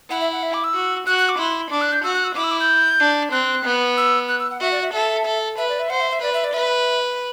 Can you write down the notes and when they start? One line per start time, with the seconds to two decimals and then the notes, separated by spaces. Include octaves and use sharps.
0.10 E4 F#5
0.21 E5
0.32 F#5
0.43 E5
0.54 D6
0.64 E6
0.74 F#4
1.07 F#4 F#6
1.18 F#6
1.29 D6
1.38 E4 C6
1.71 D4 D6
1.81 F#6
1.92 G6
2.04 F#4 E6
2.14 F#6
2.24 E6
2.35 E4 D6
2.44 E6
2.51 D6
2.60 G6
3.00 D4
3.32 C4 F#6
3.65 B3
3.97 E6
4.28 F#6
4.40 E6
4.50 F#5
4.60 F#4 E5
4.72 D5
4.82 E5
4.93 A4 E5
5.25 A4
5.58 B4 E5
5.69 D5
5.79 E5
5.90 C5 F#5
6.00 E5
6.11 E5
6.21 B4 D5
6.33 E5
6.44 D5
6.54 B4 E5